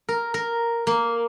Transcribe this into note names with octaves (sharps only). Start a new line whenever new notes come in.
A#4
A#4
A#3